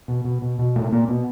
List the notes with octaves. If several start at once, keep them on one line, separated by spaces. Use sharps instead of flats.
B2
B2
B2
B2
A#2 A3
A#2 A#3
B2 B3